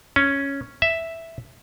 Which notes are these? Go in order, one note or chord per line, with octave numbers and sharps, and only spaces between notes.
C#4
E5